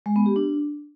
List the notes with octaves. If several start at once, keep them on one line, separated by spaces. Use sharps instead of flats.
G#3
B3
G4
D4